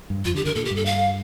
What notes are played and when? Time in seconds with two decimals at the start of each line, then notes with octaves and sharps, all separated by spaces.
0.10 G2
0.25 F2 F4
0.35 D3 G4
0.45 D3 A#4
0.55 A#2 A4
0.65 G4
0.71 G2
0.76 A4
0.86 F5